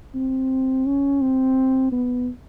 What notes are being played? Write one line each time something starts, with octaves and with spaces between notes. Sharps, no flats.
C4
C#4
C4
B3